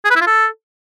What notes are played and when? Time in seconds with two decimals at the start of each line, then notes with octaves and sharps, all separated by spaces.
0.05 G#4
0.10 B4
0.16 E4
0.21 F4
0.27 A4